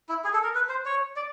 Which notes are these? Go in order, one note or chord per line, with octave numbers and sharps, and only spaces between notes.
E4
G#4
A4
A#4
B4
C5
C#5
D5